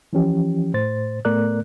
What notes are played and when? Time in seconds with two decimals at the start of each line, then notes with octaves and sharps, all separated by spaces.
0.13 E3 F3 C#4 G4
0.74 A2 C5 A6
1.25 A2 A3 B3 A#4 D5 F#6